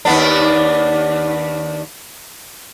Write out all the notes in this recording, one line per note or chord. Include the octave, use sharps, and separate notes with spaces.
D#2 B3 D4